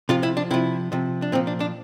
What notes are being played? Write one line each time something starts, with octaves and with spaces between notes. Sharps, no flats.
C3 F3 F4
E4
D4
C3 F3 E4
C3 F3
D4
A#2 F3 C4
D4
D4